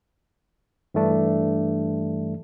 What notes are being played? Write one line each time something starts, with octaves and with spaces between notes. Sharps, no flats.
G2 E3 A3 D4